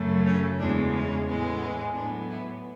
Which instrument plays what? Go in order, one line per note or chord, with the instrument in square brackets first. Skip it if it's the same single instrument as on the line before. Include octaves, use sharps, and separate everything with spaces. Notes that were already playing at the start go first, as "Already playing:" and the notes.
Already playing: [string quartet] F#2 C#3 F#3 A3
C#4
E2 C#3 G#3 D4
C#4
A2 E3 G#3 B3
A2 F#3 B3 D4
E4